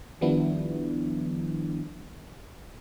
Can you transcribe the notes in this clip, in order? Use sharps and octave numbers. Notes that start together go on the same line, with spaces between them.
D#3 F3 G3 B3 D4 E4